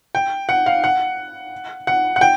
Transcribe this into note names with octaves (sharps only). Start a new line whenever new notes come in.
G5
F#5
F5
F#5
F#5
F#5
G5